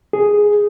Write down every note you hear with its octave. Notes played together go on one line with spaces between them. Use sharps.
G#4